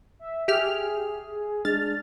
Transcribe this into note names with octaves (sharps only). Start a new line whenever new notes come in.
E5
G4 G#4 E5 F6
G#3 D4 F6 A6